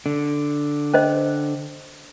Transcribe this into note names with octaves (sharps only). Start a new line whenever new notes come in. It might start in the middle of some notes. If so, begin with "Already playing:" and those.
D3
C#4 C5 D#5